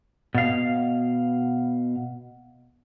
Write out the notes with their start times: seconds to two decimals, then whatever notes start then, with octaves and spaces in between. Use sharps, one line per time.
0.35 B2 F5